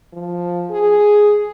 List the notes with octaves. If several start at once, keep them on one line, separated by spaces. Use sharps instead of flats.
F3
G#4